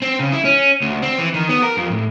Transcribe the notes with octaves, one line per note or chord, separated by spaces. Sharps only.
C4
C#3
E4
C#4
D2
C4
E3
D#3
B3
A#4
F2
A2